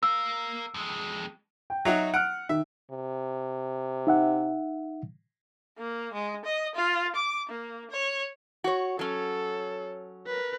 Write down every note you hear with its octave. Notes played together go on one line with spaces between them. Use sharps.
A#4 F5 E6
F2 G#3
G5
F#3 D#4 F#4 E5
F#5 F6 F#6 D7
D#3 E5
C3
D#4 E5 F#5
A#3
G#3
D#5
F4
D6
A#3
C#5
F#4 C#5
F#3 C#4 A4
A#4 B4